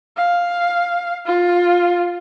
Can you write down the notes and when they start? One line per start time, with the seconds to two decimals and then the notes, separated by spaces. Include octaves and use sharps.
0.17 F5
1.26 F4